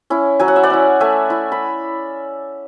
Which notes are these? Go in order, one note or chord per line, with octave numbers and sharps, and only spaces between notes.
C#4 E4
F#3 G#5
F#5
E5
D5 F#5
C#4 E4
A3 E5 G#5
E4
B5